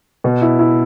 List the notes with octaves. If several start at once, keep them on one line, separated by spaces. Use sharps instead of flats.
B2
E4
E4